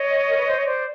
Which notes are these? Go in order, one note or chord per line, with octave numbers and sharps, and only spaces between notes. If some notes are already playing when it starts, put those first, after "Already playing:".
Already playing: C#5 D#5
A#4
B4
C5
C#5
C5 D5